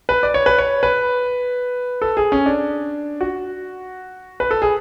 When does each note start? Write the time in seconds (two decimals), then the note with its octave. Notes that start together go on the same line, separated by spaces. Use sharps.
0.09 B4
0.23 D5
0.34 C#5
0.46 B4
0.58 C#5
0.83 B4
2.02 A4
2.17 G#4
2.32 C#4
2.46 D4
3.21 F#4
4.40 B4
4.51 A4
4.62 G#4